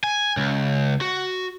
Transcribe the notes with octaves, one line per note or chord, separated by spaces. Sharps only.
G#5
C#2
F#4